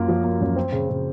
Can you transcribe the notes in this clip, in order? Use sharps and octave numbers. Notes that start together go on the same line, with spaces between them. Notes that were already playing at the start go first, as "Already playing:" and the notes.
Already playing: F#2 A#3 F4
F3
A#3
F#2
C4
C#3
C#3